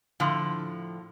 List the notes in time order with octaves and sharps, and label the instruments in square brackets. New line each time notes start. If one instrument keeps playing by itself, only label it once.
[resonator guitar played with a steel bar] A2 D3 F3